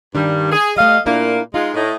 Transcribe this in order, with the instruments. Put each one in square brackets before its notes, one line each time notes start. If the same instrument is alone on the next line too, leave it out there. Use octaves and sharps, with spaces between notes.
[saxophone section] G2 G3 [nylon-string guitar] D#3 D4
[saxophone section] G#4
[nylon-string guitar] G3 A3 [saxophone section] D#5 F5
[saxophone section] A#2 A#3 [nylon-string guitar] D4 E4 A#4
[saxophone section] G#3 F4 [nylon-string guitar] D#4
[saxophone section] A2 D#5